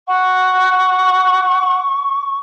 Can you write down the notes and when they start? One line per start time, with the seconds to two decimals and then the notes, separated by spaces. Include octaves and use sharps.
0.08 F#5 C#6